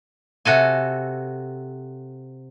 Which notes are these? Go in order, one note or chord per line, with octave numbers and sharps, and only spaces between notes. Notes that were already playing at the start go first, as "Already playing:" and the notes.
C3 F#4 A4 G#5